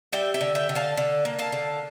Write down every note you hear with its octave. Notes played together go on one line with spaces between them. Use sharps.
G3 E5 G5
E5 G5
D3
E5 G5
D3
F5 A5
D3
A#3
F5 A5
D3